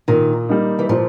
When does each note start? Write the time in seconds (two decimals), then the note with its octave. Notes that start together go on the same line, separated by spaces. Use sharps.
0.08 A#2 D#3
0.49 G3 A#3 D#4
0.79 E3
0.89 A#2 F3